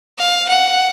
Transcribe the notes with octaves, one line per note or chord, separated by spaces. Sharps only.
F5
F#5